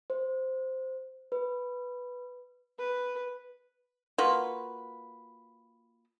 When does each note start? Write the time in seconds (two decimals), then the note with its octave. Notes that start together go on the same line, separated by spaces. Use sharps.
0.10 C5
1.32 B4
2.78 B4
4.18 A#3 F4 F#4 B4